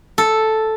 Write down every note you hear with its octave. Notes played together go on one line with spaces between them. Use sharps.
A4